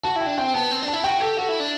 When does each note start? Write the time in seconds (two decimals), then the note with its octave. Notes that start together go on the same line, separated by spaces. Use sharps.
0.04 F#4 A5
0.16 E4
0.21 G5
0.26 D4
0.38 C4 G5
0.54 B3 A5
0.71 C4
0.83 D4
0.88 A5
0.93 E4
1.04 F#4 G5
1.21 G4 A4
1.38 F#4 A4
1.49 E4
1.60 D4